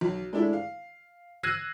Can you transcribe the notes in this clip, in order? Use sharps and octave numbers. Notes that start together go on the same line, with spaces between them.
B1
G#3 A3 D4 E4
F5
E6 F#6 G#6 A#6 C7 D#7